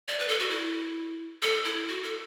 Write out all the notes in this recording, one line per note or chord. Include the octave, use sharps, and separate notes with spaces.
D5
B4
A4
F#4
E4
A4
E4
F#4
A4